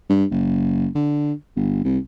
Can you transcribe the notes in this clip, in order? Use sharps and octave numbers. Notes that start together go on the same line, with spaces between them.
G2
F#1
D3
G1
C2